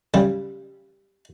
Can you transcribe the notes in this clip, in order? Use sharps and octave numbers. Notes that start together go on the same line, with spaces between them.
C#3 G3